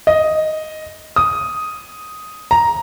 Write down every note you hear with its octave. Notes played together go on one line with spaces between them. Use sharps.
D#5
D#6
A#5